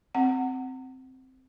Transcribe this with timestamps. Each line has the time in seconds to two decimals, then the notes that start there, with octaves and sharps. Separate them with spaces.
0.15 C4 F#5